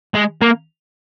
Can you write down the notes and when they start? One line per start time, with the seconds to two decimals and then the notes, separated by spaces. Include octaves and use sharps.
0.14 G#3
0.42 A#3